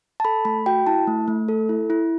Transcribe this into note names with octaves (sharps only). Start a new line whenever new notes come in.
A5
A4 B5
A3 B5
F#4 G5
E4 A5
A3
A3
A4
E4
E4